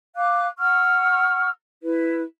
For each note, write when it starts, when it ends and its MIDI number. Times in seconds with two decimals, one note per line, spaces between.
0.15 0.46 77
0.15 0.46 86
0.15 0.46 90
0.58 1.49 78
0.58 1.49 85
0.58 1.49 88
0.58 1.49 89
1.82 2.21 64
1.82 2.21 71